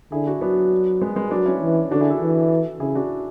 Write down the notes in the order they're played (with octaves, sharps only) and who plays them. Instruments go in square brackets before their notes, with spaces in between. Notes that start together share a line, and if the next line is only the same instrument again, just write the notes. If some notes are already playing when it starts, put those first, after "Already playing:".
[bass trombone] D3 [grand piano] E4 G#4
[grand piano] D4 F#4
[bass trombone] F#3 [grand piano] B3 D4
[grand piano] G#3 B3
G#3 B3
[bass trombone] F#3 [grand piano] B3 D4
[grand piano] C#4 E4
[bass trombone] E3
[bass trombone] D3 [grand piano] D4 F#4
[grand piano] E4 G#4
F#4 A4
[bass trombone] E3
[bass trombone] C#3 [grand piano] E4 G#4
[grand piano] D4 F#4